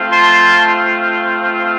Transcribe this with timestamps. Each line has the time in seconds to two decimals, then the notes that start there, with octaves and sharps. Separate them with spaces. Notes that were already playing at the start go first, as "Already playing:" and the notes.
Already playing: A3 C4 F4
0.11 A5 C6